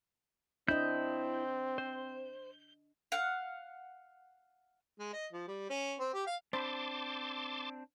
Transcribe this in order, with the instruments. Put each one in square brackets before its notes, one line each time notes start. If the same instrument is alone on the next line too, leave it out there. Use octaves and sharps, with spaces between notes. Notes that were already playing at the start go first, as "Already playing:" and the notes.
[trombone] C4 [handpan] D4 D#5 [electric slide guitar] E4 [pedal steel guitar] G6
[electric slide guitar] C5
[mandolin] F5 F#5
[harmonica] G#3
D#5
F3
G3
C#4
C4
G4
F5
[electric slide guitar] C4 D4 [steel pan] C5 B5 [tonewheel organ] A5 C6 D6